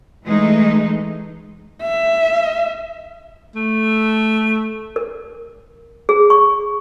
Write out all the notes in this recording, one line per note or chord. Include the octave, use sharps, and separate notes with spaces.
E3 G#3 A3 D#4
E5
A3
A#4
G#4
C#6